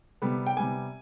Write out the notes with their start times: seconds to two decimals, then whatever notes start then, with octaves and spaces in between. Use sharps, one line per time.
0.22 C3 G3 B3
0.47 G5
0.56 C3 G3 B3 G#5